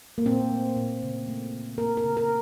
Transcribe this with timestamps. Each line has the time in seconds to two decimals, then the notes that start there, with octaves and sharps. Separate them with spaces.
0.18 A#3
0.25 A#2 C4
0.51 A3
0.77 A#2
1.03 C#3
1.28 A3
1.53 C#3
1.78 A#3 A#4
1.97 A#4
2.04 C#3
2.17 A#4